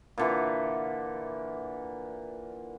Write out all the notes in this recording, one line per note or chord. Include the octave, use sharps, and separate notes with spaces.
A#2 D3 E3